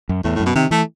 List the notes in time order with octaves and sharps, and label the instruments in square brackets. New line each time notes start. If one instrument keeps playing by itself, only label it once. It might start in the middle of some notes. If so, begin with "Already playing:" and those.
[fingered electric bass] F#2
[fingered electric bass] E2 [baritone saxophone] A2
[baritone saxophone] A2
[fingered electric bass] F#2
[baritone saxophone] B2
[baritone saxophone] C3 [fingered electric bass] D#3
[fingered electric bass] E3 [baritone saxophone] A3